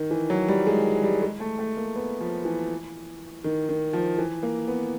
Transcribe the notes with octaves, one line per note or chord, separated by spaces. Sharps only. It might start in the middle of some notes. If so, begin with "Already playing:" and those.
Already playing: D#3
E3
F#3
G3
G#3
G3
G#3
A3
A3
A#3
B3
F3
E3
D#3
D#3
F3
E3
A#3
B3